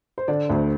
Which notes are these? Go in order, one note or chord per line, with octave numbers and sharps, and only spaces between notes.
C5
D3 D5
D2 C5